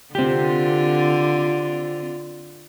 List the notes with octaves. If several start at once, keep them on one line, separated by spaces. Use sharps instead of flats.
D3 C4 F4 G4